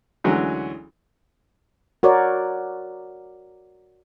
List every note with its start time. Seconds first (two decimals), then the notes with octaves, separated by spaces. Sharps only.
0.24 D2 D3 E3 F#3 G#3 C#4
2.03 F#4 A#4 C#5 D5